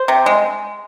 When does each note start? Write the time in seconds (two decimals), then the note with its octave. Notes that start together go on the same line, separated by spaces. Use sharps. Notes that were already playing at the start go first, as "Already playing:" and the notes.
Already playing: C5
0.08 C3
0.26 G#3